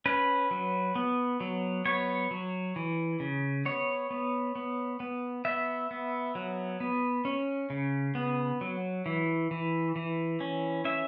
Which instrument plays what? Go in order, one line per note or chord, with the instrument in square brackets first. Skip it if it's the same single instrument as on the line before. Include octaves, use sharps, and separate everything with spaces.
[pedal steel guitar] C#4 B4
F#3
B3
F#3
B3 C#5
F#3
E3
C#3
B3 C#5
B3
B3
B3
B3 E5
B3
F#3
B3
C#4
C#3
B3
F#3
E3
E3
E3
C#4
C#4 E5